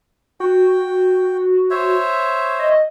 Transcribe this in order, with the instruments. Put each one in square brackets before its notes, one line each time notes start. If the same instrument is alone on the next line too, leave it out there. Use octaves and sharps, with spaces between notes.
[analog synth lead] F#4 [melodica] G5
[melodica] C5 C#5 E5
[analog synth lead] D#5